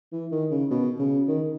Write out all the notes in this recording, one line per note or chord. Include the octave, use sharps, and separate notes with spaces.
E3
D#3
C#3
B2
C#3
D#3